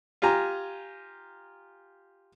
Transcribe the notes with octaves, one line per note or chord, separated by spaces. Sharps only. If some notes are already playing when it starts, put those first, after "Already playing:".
F4 G4 G#5 A#5